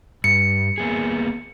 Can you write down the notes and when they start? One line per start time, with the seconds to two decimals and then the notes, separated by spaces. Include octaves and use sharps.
0.24 G2 C#7
0.78 A#3 B3 G#4